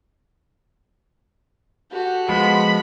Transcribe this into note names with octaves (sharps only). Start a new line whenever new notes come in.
F#4 G4 A4
F3 G#3 B3 B5